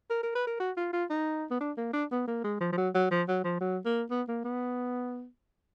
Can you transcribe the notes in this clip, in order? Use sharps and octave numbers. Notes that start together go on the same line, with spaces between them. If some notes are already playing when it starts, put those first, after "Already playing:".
A#4
A#4
B4
A#4
F#4
F4
F4
D#4
B3
D4
A#3
D4
B3
A#3
G#3
F3
F3
F#3
F#3
F3
F#3
F3
F#3
A#3
B3
A#3
B3